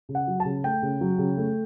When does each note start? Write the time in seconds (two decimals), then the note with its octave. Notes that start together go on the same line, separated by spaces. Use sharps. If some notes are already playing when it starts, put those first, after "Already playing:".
0.09 C#3
0.15 F#5
0.28 F#3
0.40 C#3 A5
0.64 A3 G5
0.82 C#3
1.01 F#3
1.18 C#3
1.38 A3